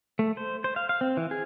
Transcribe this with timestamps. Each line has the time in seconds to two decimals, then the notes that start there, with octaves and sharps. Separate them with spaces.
0.19 A3
0.37 C5
0.64 C5
0.76 F5
0.89 F5
1.01 C4
1.17 E3
1.31 G#4